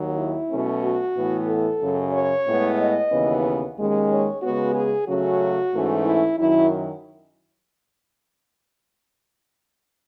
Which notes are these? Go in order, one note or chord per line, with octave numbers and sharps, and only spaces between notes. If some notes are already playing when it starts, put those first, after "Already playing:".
Already playing: D#2 D#3 F#3
E4
B2 F#3 A3 C#4
F#4
A2 E3 B3
A4
F#2 C#3 F#3
C#5
A2 G#3 B3
D#5
D#2 C#3 E3 B3
D#2 D#3 G#3 C#4
C#5
C#3 G#3 B3 F#4
G#4
C#3 F#3 A3 C#4 F#4
G#2 E3 A3 C#4
E4
F#2 D#3 F#3 E4